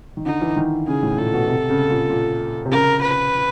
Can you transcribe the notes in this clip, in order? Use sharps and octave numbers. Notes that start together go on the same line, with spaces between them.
D#3
D3 D#4
E3
D#3
C#3 G#4
A2
A#2 A4
B2
C3
C#3
A#2
A#2
C3
C#3 A#4
B4